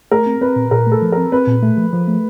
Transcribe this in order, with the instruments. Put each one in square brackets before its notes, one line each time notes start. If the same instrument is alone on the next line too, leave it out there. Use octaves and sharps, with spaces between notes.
[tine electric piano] A3 [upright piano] A#4
[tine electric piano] C4
[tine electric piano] C4 [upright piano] B4
[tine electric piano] A#2
[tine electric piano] A#2 [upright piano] A#4
[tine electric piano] A3 [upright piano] A4
[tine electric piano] F3
[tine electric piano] C4 [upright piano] A#4
[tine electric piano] C4 [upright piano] B4
[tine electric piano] A#2
A3
F3
F3
A3